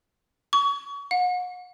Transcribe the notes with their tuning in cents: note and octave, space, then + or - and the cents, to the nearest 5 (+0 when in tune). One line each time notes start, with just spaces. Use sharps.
C#6 +30
F#5 -40